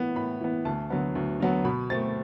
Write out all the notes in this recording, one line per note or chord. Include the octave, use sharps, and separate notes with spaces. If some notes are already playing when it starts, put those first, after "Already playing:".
Already playing: A2 E3 B3
A2 B5
E3 B3
D2 A5
D3 F#3 B3
D2
D3 F#3 B3
B2 B5
A3 C4 A6